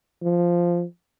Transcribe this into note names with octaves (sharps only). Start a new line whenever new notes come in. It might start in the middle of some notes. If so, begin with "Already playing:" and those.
F3